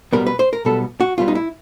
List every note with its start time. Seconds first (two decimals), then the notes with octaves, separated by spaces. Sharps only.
0.13 B1 B2 G3 B3 A#4
0.27 B4
0.39 C5
0.53 A#4
0.65 B1 B2 G3 B3 A4
1.01 F#4
1.18 B1 B2 G3 B3 F4
1.28 D#4
1.35 E4